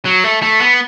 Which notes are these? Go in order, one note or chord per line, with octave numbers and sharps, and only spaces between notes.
F#3
A3
A3
B3